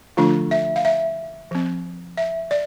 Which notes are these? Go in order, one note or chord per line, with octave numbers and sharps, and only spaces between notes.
D3 F3 A3 D4 F4
E5
F5
E5
F3 C4
E5
D5